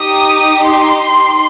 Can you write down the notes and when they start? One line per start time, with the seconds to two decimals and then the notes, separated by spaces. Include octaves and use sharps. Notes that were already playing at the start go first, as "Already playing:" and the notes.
Already playing: D#4 G4 D#6
0.64 C6